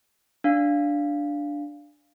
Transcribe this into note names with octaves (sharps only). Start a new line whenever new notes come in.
D4 F5